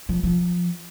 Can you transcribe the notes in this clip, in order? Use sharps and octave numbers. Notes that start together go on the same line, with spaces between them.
F3
F3